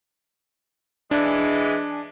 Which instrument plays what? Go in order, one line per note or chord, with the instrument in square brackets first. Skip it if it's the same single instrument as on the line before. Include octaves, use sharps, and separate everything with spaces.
[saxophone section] E3 G#3 [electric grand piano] D4